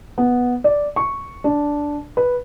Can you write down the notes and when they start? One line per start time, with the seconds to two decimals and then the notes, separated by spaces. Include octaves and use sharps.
0.18 B3
0.64 D5
0.96 C#6
1.44 D4
2.17 B4